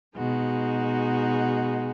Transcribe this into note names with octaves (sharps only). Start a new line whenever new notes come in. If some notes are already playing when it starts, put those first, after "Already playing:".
B2 G#3 D#4 F#4